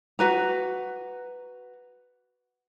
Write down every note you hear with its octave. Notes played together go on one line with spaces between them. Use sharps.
F#4 B4 A#5